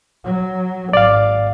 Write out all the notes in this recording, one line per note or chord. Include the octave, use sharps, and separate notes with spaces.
F#3
G#1 D5 F5